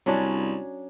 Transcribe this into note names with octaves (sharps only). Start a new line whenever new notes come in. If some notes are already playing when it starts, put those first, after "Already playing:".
C2 F#3 C#4 D4